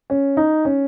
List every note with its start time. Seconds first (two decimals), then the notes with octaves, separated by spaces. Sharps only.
0.10 C#4
0.37 D#4
0.65 C#4